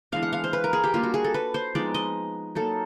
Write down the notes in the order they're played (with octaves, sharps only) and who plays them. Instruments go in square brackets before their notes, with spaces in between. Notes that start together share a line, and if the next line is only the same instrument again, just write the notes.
[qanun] E3 G#3 B3 D4 F5
F#5
F5
C5
B4
A#4
G#4
G4
G3 A#3 D4 F4
F#4
G#4
A4
B4
C5
F3 G#3 B3 D#4 D5
D#5
F#3 A#3 D#4 A4